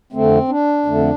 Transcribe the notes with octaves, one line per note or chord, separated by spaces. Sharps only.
F2 D3 A3 C4
D4
F2 D3 A3